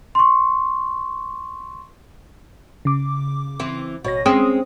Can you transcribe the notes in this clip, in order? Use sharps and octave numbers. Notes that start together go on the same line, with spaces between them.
C6 C#6
C#3 D6
E3 C4
A1 B2 C#5 A#6
G#3 C4 C#4 D#6